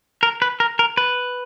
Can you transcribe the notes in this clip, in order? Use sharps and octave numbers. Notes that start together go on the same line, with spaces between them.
A#4
B4
A#4
A#4
B4